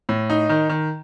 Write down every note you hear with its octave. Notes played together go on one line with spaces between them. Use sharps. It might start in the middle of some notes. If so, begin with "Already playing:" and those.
A2
D#4
D#3
D#3